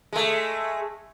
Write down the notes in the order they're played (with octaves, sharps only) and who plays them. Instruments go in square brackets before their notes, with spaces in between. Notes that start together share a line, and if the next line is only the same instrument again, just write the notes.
[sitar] G#3 A3